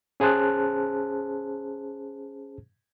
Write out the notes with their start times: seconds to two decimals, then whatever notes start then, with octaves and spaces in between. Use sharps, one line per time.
0.20 C#4 G#4 C5 A5 F#6